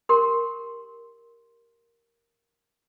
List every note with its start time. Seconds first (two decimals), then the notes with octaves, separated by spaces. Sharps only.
0.09 G4 A#4 C6